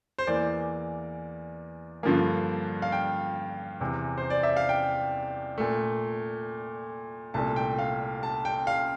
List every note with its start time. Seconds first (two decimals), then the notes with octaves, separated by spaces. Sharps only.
0.18 C5
0.27 E2 E3 A#3 D5
2.03 G2 D3 F3 A#3
2.82 F5
2.92 G5
3.80 E2 C3 E3
4.18 C5
4.30 D5
4.43 E5
4.57 F5
4.69 G5
5.58 A#2 A3
7.34 C2 A#2 A3 A5
7.56 G5
7.78 F5
8.23 A5
8.45 G5
8.67 F5